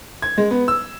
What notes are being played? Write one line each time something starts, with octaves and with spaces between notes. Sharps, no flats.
G#6
G#3
B3
E6